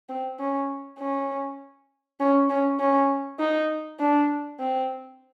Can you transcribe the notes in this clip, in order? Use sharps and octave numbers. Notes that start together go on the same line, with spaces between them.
C4
C#4
C#4
C#4
C#4
C#4
D#4
D4
C4